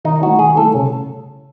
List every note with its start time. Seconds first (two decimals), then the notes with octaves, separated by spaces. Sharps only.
0.04 D#3 D#4
0.22 A3 E4 F#4
0.39 D#3 G#4
0.56 A3 E4 A4
0.74 C#3